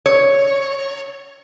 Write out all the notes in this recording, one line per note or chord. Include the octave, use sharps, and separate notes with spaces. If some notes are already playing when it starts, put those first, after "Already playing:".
C#5